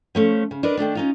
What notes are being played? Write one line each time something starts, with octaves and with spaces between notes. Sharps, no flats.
F3 A3 C#4
C#3
D4 A#4 B4 D#5
D#3 E3 A3 D4
C#4 D#4 F4